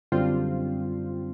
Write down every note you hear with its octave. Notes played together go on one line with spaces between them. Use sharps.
F#2 D3 G3 C4 F4